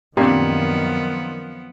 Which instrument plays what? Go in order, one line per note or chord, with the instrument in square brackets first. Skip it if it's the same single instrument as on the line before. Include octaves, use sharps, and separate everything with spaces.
[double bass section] F#2 D#3 [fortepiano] A#2 [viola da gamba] F3 B3 [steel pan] C4 D4 G4